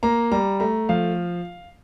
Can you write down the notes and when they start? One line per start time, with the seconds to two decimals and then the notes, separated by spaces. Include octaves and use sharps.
0.03 A#3 A#5
0.32 G3 A#5
0.60 A3 A#5
0.89 F3 F5